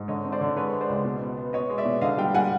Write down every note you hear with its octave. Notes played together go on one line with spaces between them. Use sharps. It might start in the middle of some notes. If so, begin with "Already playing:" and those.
Already playing: G#2
D3 C#5 D#5
C4
C5 D5
D3
G#3 B4 C#5
G#3
C5 D5
C#2
B2
B3
B3
B3 C#5 D#5
G#3
D5 E5
B2
D3 D#5 F5
G3 F5 G5
G3 F#5 G#5